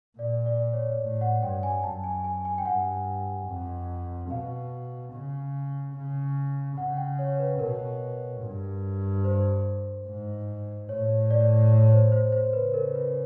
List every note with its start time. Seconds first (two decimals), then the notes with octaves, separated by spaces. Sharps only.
0.18 A#2 D5
0.46 D5
0.73 C#5
1.01 A2
1.21 F#5
1.41 G2 G5
1.63 G#5
1.83 F#2 A5
2.04 G#5
2.24 G#5
2.45 G#5
2.58 G5
2.65 G2 F#5
3.48 F2
4.30 B2 F5
5.12 C#3
5.94 C#3
6.77 C#3 F#5
6.97 G5
7.19 C#5
7.39 B4
7.59 B2 A#4
8.42 G2
9.24 C5
10.06 G#2
10.89 A2 C#5
11.31 D5
11.72 C#5
11.92 C5
12.12 C5
12.32 C5
12.53 C#3 B4
12.74 A#4
12.95 B4